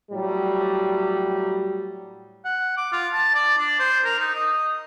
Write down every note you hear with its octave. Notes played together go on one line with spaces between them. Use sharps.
A2 F#3 G3
F#5
D6
F4
A5
D5
D4
C5
A#4
D#4
D#5